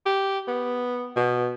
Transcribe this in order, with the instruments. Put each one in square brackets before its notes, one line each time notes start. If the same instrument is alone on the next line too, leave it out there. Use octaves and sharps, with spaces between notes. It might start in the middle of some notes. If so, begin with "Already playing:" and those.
[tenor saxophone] G4
B3
B2